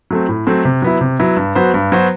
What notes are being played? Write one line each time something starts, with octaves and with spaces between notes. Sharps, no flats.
F#3 A3 C4
A2
F#3 A3 C4
C3
F#3 B3 E4
C3
F#3 B3 E4
G2
F#3 B3 F#4 C5
G2
F#3 B3 F#4 C5